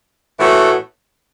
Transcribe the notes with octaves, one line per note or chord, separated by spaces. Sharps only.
A2 E3 B3 F#4 A4